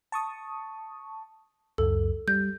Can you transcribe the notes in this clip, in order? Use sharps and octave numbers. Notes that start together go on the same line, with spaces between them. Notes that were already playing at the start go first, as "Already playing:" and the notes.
A5 C#6 D#6
C#2 F#2 A4
G3 G6